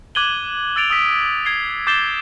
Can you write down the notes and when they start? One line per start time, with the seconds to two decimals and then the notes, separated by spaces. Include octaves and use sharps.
0.15 D6 F#6 G#6 D#7 F#7 G7
0.76 E6 A6 D7 F7
0.90 D#6 E6 B6 D7
1.45 G#6 C7 G7
1.87 D6 G6 A6 C7 E7 G7